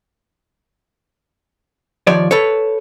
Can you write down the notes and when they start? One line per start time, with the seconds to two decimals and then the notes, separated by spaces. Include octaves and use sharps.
2.07 D#2 F3 C#5 D5
2.31 A4 B4 C#5